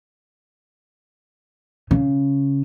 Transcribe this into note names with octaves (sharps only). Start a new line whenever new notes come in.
C#3